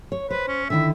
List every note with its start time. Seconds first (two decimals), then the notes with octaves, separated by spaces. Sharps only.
0.12 C#5
0.30 B4 C5
0.48 C#4
0.70 D3 D#3 E4 E5